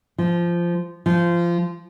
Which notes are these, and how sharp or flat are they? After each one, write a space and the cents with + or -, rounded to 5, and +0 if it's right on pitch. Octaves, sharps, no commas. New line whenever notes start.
F3 -15
F3 -20